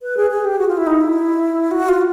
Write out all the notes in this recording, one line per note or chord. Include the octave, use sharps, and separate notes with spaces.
B4
G#4
G#4
G4
F#4
F4
E4
D#4
E4
F#4
F4